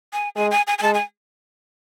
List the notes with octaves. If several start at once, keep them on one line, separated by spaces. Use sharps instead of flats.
G#5
G#3 G#5
G#5
G#5
G#5
G#3 A5
G#5